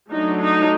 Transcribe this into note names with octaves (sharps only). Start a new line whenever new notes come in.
F#3 A3 D4 D#4
D#4